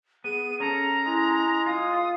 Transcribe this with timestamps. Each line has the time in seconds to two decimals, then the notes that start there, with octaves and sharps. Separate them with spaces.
0.24 B3 G#4 D#7
0.60 C#4 A4 A#5
1.06 G#3 E4
1.66 F4 D#6